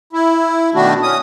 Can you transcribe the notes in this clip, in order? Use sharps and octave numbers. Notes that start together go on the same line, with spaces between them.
E4
B2 D#3 A3 D4 F#4
C#4 D#6